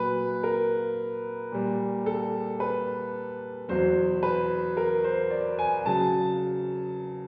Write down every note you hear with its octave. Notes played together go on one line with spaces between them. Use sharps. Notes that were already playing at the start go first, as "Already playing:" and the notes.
Already playing: A#2 F#3 B4
A#4
A#2 G3
A4
B4
E2 B2 F#3 C5
B4
A#4
C5
D5
G#5
C#3 F#3 A5